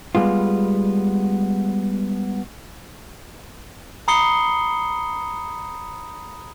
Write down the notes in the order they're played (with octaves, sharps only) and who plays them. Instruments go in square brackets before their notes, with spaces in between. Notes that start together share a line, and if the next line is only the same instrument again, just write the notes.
[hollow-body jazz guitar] G3 G#3 B3 F4
[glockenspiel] A#5 B5 D#6 C7 C#7 G7